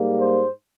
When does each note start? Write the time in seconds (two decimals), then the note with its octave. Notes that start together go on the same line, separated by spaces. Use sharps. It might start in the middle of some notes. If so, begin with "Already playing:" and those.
Already playing: G#2 G3 A#3
0.20 C5